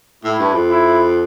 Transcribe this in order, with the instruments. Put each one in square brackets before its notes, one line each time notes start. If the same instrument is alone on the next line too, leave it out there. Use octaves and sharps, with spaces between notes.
[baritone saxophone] A2 [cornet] E4
[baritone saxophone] G2
F2
[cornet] E4